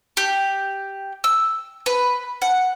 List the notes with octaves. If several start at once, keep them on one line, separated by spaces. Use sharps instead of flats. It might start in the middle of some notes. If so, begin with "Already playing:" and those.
G4
E6
B4
F#5